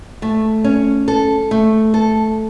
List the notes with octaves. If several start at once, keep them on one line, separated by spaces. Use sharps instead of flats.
A3
C#4
A4
A3
A4